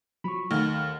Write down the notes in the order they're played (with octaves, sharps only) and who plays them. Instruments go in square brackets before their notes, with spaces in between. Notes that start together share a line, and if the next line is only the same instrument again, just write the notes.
[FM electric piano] F3 F#3 [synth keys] B5 C#6
[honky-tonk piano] D#2 [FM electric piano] A3 D#5 F#5 [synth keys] F6